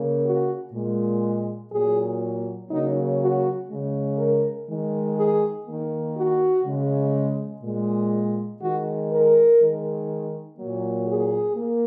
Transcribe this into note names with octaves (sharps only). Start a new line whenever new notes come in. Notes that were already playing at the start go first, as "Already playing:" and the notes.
Already playing: C#3 A#3
F#4
A#2 G#3
A#2 F#3 A#3 G#4
C#3 F#3 A#3 D#4
F#4
C#3 G#3
A#4
D#3 G#3
G#4
D#3 A#3
F#4
C#3 G#3
A#2 G#3
D#3 G#3 F#4
A#4
D#3 G#3
A#2 F#3 A#3
G#4
A#3